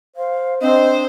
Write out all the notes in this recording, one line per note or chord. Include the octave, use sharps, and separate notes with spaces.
C5 F5
C4 D4 C5 D#5